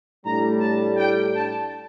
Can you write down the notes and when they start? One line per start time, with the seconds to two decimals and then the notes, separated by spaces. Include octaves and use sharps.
0.24 A2 G3 D4 A#5
0.60 A5
0.96 G5
1.33 A5